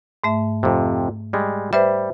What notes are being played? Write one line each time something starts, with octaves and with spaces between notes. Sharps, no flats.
G#2 A3 E5
F2 C3
G3 G#3
G3 B4 C5 E5